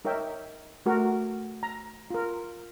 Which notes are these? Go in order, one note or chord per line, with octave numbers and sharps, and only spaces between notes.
D#4 A#4 C#5 E5 G5
A3 F#4 A#4
A#5
F4 A#4